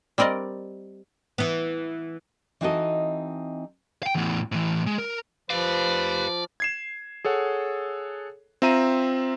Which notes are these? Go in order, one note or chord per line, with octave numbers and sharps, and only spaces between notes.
G3 C4 A#4 D5 D#5
E3 B3
E3 C4 D#4 F#4 A4 D#5
F5 G5
E2 A2
A2 E3
G#3
A#4
F3 G4 B4 D5 F5
G#6 C7 E7
G#4 A4 C#5 F#5
C4 F4 E5 A#5 D#7